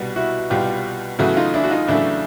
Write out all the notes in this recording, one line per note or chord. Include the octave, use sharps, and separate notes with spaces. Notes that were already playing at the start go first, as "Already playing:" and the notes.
Already playing: C2 B2 G3
E4 F#4
C2 B2 G3 F4 G4
E2 C#3 F#3 A3 E4 F#4
D#4 F4
D4 E4
F#4
D#4 F4
E2 C#3 F#3 A3 D4 E4